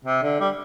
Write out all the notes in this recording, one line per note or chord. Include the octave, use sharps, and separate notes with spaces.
C3
D3
G3